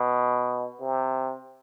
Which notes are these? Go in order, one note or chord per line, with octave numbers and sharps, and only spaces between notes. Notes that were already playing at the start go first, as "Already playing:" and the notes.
Already playing: B2
C3